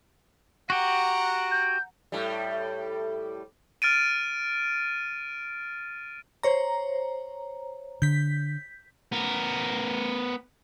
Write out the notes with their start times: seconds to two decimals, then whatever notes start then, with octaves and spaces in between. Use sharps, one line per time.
0.70 F#4 G4 F#5 A#5
1.51 G6
2.12 A2 G3
3.82 F6 A6 D7 D#7
6.43 C5 C#5 A#5
8.02 D3 G6 B6
9.12 B3 A#4